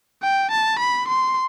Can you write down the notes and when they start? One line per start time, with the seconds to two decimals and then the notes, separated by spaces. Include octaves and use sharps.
0.23 G5
0.51 A5
0.79 B5
1.08 C6